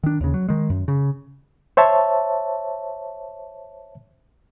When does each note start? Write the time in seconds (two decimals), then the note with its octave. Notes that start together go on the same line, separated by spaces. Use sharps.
0.03 D#3 D4
0.21 D#2 C#3
0.34 F#3
0.49 D#3 G#3
0.70 F#2
0.88 C#3
1.77 C5 C#5 E5 A5